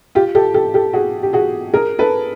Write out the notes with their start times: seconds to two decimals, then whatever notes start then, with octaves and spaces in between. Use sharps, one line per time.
0.15 F4 G4
0.35 G4 A4
0.54 G4 A4
0.74 G4 A4
0.93 F#4 G#4
1.23 G4
1.33 F#4 G#4
1.74 G#4 A#4
1.99 A4 B4